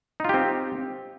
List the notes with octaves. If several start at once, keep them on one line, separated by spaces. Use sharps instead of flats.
C4 D#4 F4 G4